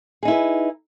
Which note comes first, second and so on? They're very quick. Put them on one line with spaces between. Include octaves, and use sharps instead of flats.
G#4 D#4 E4 B4